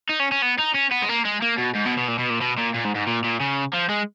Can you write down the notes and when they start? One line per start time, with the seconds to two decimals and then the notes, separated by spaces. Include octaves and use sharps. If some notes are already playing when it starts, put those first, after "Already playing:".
0.09 D#4
0.20 C#4
0.32 C#4
0.42 B3
0.59 D#4
0.75 C#4
0.92 B3
1.03 G#3
1.09 A#3
1.25 G#3
1.42 A#3
1.58 B2
1.75 G#2
1.86 B2
1.97 B2
2.08 A#2
2.19 B2
2.30 A#2
2.41 B2
2.58 A#2
2.75 A#2
2.85 G#2
2.95 G#2
3.07 A#2
3.24 A#2
3.40 C#3
3.74 F3
3.90 G#3